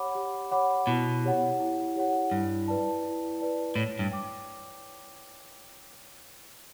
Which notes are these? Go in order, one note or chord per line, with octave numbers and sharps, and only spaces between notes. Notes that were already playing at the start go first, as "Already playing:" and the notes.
Already playing: G4 C#5 F#5 B5 D6
G4
C#5 F#5 B5 D6
B2 E4
G4 C#5 F#5
E4
G4 C#5 F#5
G2 E4
B4 D5 A5
E4
B4 D5 A5
A2 C#5
G2
G5 D6